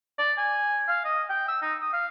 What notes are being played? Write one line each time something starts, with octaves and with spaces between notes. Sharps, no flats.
D5
G#5
F5
D#5
G5
E6
D#4
D#6
F5